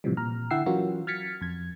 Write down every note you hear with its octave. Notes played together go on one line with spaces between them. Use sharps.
A2 C3 E3 F3 G3
A#2 A#5 F6
D3 E4 F#5 G5 E6 C7
E3 F#3 C#4 F4 F#4 A#4
F6 G#6 A6 B6 C#7
F2 G#6